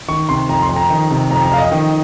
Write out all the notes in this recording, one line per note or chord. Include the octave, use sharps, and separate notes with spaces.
D#3 C#6
C3 C6
F2 A#5
C6
F2
A#5
D#3
C3
F2 A#5
A#5
F2 F5
D#5
D#3